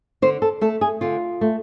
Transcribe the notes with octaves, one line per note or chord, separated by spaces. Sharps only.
D3 C5
A4
A3 A4
G#4
D3 F4
A3